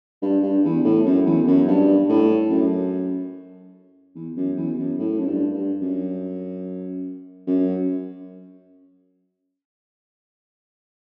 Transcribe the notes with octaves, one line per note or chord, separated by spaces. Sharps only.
G2
G2
E2
A2
F#2
E2
F#2
G2
A2
F#2
E2
F#2
E2
F#2
A2
F#2
G2
G2
F#2
F#2